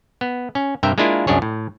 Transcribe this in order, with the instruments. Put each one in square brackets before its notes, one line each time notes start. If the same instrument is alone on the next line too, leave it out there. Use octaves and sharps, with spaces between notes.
[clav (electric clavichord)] B3
C#4
G2 C3 A#4 E5 G5
G#3 A#3 D4 E4 F4 A#4
C2 F#2 D4 G#4 C#5
A2